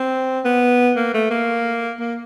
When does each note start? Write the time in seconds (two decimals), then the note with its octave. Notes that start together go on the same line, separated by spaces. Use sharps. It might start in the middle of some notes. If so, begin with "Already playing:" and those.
Already playing: C4
0.45 B3
0.97 A#3
1.14 A3
1.31 A#3
2.00 A#3